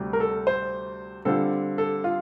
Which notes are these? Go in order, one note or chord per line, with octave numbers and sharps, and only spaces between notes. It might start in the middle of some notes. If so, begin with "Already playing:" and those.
Already playing: D2 C3 G3
A#4
A4
C5
D3 G3 C4 F4 A4
A4
F4